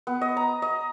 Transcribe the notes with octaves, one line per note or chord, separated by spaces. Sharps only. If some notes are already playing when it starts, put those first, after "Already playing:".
B3
D#5
A#5
D#5